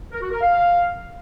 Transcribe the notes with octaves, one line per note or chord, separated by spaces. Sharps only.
A#4
F#4
A#4
F5